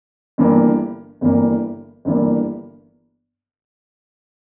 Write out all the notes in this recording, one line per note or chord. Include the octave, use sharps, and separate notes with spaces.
G1 G2 E3 A#3
G1 G2 E3 A#3
G1 G2 E3 A#3